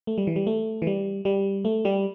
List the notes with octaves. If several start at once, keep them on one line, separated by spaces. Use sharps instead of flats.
A3
G3
E3
G3
A3
E3
G3
G3
A3
G3